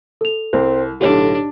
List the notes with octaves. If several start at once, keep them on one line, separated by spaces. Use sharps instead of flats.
A4 F7
C2 C4
B1 A2 D3 D4 G4 C#5